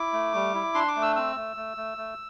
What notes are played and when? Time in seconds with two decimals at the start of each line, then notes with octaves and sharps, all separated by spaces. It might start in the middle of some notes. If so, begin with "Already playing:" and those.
Already playing: E4 D6
0.13 A3
0.34 G3
0.54 E4
0.74 D4 C6
0.88 D6
0.96 A3
1.02 E6
1.16 C4 E6
1.36 A3
1.56 A3
1.77 A3
1.98 A3